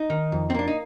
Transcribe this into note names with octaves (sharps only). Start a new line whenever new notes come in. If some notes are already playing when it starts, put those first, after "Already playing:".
Already playing: D#4
D#3
F2
C4
A#3 D4
D#4